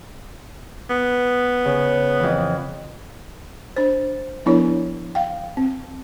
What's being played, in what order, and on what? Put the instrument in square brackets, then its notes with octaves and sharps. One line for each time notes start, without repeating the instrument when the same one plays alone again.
[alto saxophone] B3
[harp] C#3
F2 E3
[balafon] D4 C5
F3 B3 D4 E4 A#4 C#5
F5 G5
C4